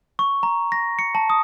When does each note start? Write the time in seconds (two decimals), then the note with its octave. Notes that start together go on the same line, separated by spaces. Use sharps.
0.19 C#6
0.43 A#5
0.72 A#6
0.99 C#7
1.15 A5
1.30 D#6